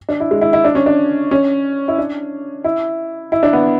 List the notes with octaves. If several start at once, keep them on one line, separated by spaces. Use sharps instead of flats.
D4
E4
G#3
E4
E4
D4
C#4
D4
C#4
E4
D4
E4
E4
D4
B3